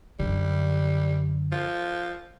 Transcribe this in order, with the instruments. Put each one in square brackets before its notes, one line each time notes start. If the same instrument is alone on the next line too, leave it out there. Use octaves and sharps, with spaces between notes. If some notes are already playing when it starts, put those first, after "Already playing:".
[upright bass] F#2 D3 [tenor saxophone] G3
[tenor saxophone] F3